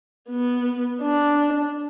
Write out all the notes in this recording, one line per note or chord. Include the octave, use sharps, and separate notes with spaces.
B3
D4